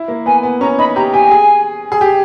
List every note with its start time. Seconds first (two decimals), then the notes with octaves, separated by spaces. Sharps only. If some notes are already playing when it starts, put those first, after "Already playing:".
Already playing: E4
0.08 A#3
0.26 B3 G#5
0.43 B3
0.61 C#4 A#5
0.79 D#4 B5
0.96 G4 A#5
1.13 G4 G#5
1.31 G#4
1.92 G#4
2.01 G4